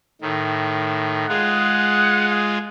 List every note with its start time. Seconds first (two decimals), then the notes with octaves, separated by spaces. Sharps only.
0.21 A2 D#3
1.29 G#3 F4 G#4 F#5